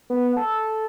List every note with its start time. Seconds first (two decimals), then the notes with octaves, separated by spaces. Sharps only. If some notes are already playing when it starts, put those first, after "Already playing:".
0.10 B3
0.37 A4